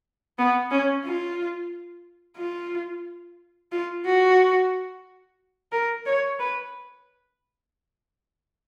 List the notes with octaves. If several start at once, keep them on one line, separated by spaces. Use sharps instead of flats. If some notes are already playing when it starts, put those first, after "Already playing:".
B3
C#4
F4
F4
F4
F#4
A#4
C#5
B4